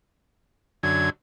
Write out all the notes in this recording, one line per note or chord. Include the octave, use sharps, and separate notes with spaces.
F#2 D3 G#6